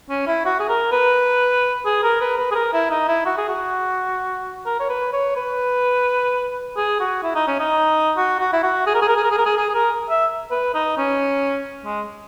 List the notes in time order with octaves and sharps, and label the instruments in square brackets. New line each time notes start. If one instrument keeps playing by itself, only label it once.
[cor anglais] C#4
E4
F#4
G#4
A#4
B4
G#4
A#4
B4
B4
G#4
A#4
E4
D#4
E4
F#4
G#4
F#4
A#4
C#5
B4
C#5
B4
G#4
F#4
E4
D#4
C#4
D#4
F#4
F#4
E4
F#4
G#4
A#4
G#4
A#4
G#4
A#4
G#4
A#4
G#4
G#4
G#4
A#4
E5
B4
D#4
C#4
G#3